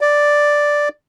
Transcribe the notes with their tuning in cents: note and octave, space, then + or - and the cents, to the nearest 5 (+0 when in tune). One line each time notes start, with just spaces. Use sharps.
D5 +0